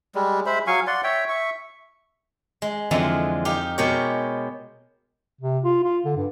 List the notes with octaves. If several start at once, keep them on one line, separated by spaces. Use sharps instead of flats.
G3 G#3
G#3 C5 E5 B5
F#3 F5 G#5 C#6
D5 F#5 C6
C#5 E5 G5
E5 C#6
G#3
F2 D3 E3 F3 G#3 A#5
D#4 G4 F5
B2 G#3 G4 A#4 C#5
C3
F4
F4
D3
G2